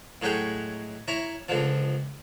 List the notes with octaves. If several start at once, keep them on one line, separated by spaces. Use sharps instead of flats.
A2 F#3 G#3 C#5 G5
E4 C#5 A#5
C#2 D3 F3